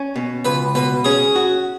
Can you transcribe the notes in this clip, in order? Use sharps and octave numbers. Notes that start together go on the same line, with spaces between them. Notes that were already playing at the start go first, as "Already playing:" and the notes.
Already playing: C#4
B2
C#2 B4
B2 B4
C#4 G#4
F#4